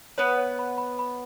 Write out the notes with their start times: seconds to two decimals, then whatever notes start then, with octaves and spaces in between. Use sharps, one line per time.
0.18 B3 B4 C#5
0.38 C#5
0.59 B5
0.78 B5
0.99 B5